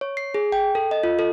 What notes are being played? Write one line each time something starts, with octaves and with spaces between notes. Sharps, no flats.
C#5
C7
G#4
G5
A4
D#5
F4
A4